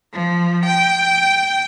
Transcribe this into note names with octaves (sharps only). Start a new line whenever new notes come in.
F3
G5